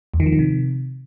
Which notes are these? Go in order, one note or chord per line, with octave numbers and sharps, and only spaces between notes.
E2
D#3
F3
D#3
C3